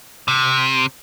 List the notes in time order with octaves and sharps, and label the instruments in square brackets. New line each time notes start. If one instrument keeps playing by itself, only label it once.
[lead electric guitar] C3